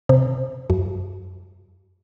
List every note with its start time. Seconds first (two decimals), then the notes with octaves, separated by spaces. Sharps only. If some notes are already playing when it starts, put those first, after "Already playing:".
0.09 C3
0.70 F#2